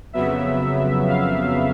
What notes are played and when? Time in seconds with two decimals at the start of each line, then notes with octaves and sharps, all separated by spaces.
0.13 F2 C#3 F#3 B3 E5
1.08 F5